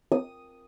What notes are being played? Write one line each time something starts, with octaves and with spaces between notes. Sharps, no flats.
D#6